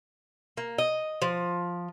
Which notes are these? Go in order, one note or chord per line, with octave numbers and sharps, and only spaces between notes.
A#3
D#5
F3